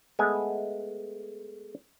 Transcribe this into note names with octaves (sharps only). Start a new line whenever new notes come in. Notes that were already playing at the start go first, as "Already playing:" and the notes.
G#3 A3 B3 G#5